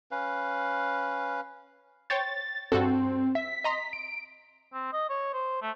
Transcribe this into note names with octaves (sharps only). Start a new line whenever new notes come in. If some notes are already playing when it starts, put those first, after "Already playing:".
C#4 B4 F5
C5 C#5 G5 A6
G2 C4 F#4 A4
E5 B6
D#5 A#5 C6
D7
C4
D#5
C#5
C5
A3